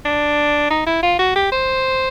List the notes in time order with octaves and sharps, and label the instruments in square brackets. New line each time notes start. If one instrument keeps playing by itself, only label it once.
[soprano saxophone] D4
D#4
E4
F4
F#4
G4
C5